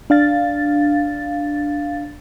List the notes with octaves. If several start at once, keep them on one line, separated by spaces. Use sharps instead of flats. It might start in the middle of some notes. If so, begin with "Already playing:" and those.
D4 F5 A6